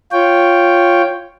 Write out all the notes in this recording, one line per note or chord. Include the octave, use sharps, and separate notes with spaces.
F4 C#5 G5